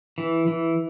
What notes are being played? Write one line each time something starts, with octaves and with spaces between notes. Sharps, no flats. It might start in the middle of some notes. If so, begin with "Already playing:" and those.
E3
E3